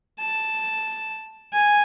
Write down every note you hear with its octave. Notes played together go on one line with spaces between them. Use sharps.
A5
G#5